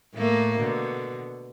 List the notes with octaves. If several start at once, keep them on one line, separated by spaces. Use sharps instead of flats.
A2 A3 A#3
B2 D3